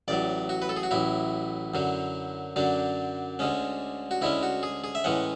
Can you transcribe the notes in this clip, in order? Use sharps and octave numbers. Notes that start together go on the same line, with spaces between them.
A1 A2 F#3 D5
F#4
B4
A4
G#4
F#4
A1 A2 F#3 E4
F#2 D3 F#3
F#2 D3 F#3 D4
D2 D3 G#3 C#4
F#4
D2 D3 G#3 C#4 E4
F#4
G#4
G#4
E5
A2 E3 G#3 C#4 F#5